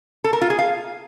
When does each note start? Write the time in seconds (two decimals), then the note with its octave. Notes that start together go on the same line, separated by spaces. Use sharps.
0.24 A4
0.33 A#4
0.41 F4
0.50 G#4
0.59 F5